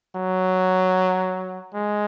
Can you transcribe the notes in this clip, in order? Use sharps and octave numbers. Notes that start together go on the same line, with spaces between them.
F#3
G#3